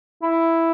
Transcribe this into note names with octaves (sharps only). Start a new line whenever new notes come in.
E4